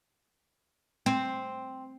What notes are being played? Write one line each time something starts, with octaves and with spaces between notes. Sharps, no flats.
C4